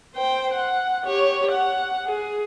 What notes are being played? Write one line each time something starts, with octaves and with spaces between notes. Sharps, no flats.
C5 G5
F#5
G4 C#5
F#5
G#4